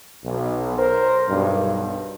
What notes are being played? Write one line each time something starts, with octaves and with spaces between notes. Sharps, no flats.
B1
A#4 C5
B1 G2